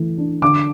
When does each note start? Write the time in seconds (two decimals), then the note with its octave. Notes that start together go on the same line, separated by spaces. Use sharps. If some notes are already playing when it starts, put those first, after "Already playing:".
Already playing: E3 A3
0.18 D4
0.42 D3 D6